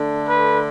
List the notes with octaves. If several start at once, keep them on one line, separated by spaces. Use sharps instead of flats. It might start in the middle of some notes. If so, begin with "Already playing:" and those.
Already playing: D3 A3 D4
B4